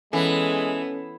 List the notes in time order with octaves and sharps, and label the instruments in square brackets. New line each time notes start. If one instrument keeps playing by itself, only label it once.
[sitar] E3 [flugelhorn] G#3 [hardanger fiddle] B3 [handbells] C#4 A4